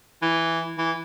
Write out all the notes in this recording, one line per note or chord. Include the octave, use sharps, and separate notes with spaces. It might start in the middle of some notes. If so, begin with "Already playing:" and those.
E3
E3